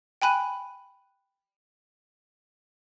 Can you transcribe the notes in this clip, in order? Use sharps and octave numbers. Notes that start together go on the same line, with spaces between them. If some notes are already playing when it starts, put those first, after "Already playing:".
G5 G#5 B5 F#6 D#7